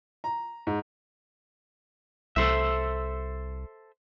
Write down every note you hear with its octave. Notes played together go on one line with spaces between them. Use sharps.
A#5
G#2
C2 A4 C5 E5